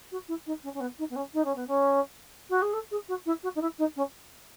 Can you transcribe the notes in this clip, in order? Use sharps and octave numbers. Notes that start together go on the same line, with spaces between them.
F#4
E4
D#4
C#4
C#4
B3
D#4
B3
C#4
D#4
C#4
B3
C#4
F#4
G#4
A4
G#4
F#4
E4
F#4
D#4
E4
D#4
C#4